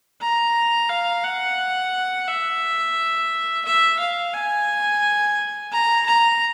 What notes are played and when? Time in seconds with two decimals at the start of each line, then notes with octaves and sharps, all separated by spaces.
0.21 A#5
0.89 F5
1.24 F#5
2.28 E5
3.65 E5
3.99 F5
4.33 G#5
5.71 A#5
6.05 A#5